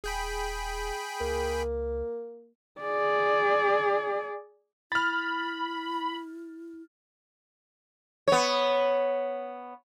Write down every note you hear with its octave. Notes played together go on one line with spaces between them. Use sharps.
D#1 G#4 G5 B5
C#2 A#3
G#4 D5
E4 B5 F6 A6
B3 C#5